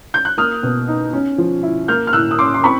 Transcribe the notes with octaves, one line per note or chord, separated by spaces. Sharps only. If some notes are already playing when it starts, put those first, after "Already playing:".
G6
F#6
A#3 D#6 F6
B2
D#4
C#4
F3
E4
A#3 F6 G6
F6
A2 E6 F#6
D#6
C#4 C6 D6
C6
C4 B5 C#6